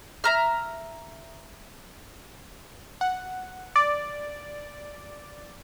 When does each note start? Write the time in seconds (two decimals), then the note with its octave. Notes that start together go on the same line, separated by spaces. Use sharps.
0.24 E5 A#5 F6
3.01 F#5
3.76 D5